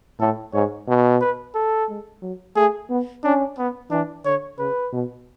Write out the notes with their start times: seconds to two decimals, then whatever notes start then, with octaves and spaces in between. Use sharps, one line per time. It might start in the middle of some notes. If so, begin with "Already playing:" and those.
0.19 A2 A4
0.53 G#2 C#5
0.88 B2
1.21 B4
1.55 A4
1.88 G#3
2.22 F#3
2.56 A3 G#4
2.90 B3
3.24 C#4 D4
3.58 B3
3.91 E3 D4
4.25 D3 C#5
4.59 C#3 B4
4.93 B2